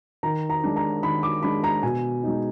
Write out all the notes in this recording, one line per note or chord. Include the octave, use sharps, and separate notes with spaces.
D#3 A#5
A#5
G#3 D4
A#5
D#3 B5
D6
G#3 D4 B5
A#5
B2 G#5
G#3 D#4